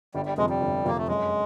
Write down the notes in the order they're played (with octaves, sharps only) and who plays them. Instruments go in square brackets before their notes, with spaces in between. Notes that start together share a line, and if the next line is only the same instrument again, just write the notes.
[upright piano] G1 [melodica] G3
[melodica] G3
[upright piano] F2 C3 [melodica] G#3
[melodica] G3
[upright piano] G1
[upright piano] F2 C3 [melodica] A#3
[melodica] A3
[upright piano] F#2 [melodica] G#3